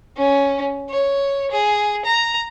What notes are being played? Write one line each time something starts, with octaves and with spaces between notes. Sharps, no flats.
C#4
C#5
G#4
A#5